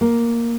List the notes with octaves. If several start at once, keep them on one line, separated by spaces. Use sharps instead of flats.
A#3